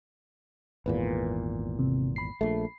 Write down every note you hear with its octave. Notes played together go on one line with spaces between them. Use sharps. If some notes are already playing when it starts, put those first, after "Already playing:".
G#1 E2 A#2 B4
C3
B5 C7
A#1 A3